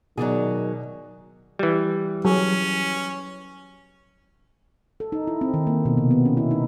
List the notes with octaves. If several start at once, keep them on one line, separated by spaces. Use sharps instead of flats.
B2 D#3 E3 F#3 D4 G#4 D5
E3 G3
F#3 C#4 G#4
A4
D#4
E4
C4
D#3
A#3
B2
C3
B3
C#4
E4
D#4